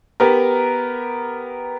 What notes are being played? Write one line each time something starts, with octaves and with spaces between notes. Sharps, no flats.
B3 G4 A#4